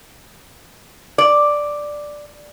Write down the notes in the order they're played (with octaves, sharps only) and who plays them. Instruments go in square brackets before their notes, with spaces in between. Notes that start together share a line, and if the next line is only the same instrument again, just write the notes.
[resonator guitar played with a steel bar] D5